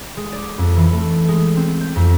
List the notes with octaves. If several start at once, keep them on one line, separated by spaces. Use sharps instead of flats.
G#3
D5
F2
E3
A3
G#3
C4
G6
F2